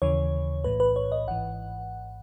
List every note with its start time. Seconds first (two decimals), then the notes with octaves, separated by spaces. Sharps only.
0.02 D#2 C#3 E3 C#5
0.64 B1 A2 E3 B4
0.80 B4
0.96 C#5
1.12 D#5
1.27 G#1 G#2 E3 F#5